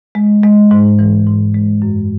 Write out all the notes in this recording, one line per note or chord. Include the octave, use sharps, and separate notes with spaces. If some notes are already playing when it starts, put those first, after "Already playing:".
G#3
G#3
G#2
E3
G#2
G#3
F#2